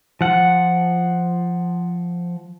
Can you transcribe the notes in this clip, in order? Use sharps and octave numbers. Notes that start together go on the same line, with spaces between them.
F3 F#5